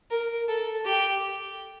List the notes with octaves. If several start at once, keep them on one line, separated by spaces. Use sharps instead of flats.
A#4
A4
G4